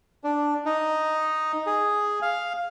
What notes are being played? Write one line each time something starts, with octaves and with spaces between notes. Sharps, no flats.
D4
D#4
G#4
F5